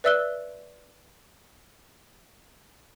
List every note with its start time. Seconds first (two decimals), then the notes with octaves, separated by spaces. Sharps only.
0.04 B4 D5 E5 E6 F#6 G7